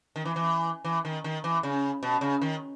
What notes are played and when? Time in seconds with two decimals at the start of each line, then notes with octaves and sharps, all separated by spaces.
0.16 D#3
0.25 E3
0.36 E3
0.84 E3
1.05 D#3
1.24 D#3
1.44 E3
1.63 C#3
2.03 B2
2.21 C#3
2.42 D#3